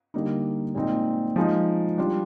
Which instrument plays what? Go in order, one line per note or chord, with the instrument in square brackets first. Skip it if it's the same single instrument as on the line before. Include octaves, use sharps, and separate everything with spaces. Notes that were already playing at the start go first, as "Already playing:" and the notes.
[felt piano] D3 G3 A#3 D#4
A#2 G#3 C4 D#4
F3 G#3 D#4
G3 D4 F4